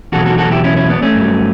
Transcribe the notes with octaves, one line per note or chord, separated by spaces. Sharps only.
E2 B2 F#3 F#4 A4
F#4 A4
F#4 A4
E4 G4
C#4 E4
C#4 E4
B3 D4
A3 C#4
G2 F#3